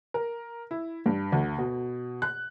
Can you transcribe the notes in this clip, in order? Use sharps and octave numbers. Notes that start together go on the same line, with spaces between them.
A#4
E4
G2
D2
B2
F#6